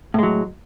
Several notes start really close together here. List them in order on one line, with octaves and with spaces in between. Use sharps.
A2 G#3 F#3